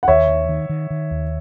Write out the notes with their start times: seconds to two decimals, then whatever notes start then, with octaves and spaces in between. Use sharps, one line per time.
0.03 F#5
0.08 D#2 C#5 E5
0.28 D#3
0.49 D#3
0.69 D#3
0.90 D#3
1.11 D#2